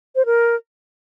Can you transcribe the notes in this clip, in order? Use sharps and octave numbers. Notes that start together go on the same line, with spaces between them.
C5
A#4